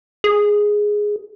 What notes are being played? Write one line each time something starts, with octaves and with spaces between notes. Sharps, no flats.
G#4